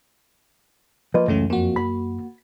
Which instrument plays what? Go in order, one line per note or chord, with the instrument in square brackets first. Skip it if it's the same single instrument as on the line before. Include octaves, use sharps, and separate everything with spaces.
[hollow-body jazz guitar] F3 A#3 D#5 [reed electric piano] B4
[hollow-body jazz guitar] C#2 [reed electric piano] F#2 [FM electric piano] E3 A3 C#4
[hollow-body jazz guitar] F2 [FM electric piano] A#3 F#4
[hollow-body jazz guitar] B5